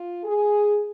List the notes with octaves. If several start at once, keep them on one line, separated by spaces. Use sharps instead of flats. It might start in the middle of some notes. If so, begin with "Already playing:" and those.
Already playing: F4
G#4